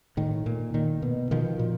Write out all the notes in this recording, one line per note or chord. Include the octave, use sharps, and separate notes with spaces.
A2 D#3
A#2
A#2 D#3
B2
B2 D#3 F3
A#2